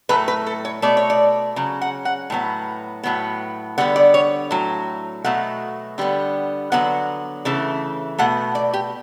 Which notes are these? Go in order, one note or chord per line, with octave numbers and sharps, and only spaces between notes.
A2 F#3 A3 B4
B4
A4
C#5
B2 A3 D5
C#5
D5
C#3 F#3
F#5
F#5
A2 F#3 B3
A2 F#3 B3
D3 G3 B3 F#5
D5
C#5
A2 F#3
B2 F#3 A3 F#5
D3 G3 B3
D3 F#3 B3 F#5
C#3 E3 A3
B2 A3 F#5
D5
G4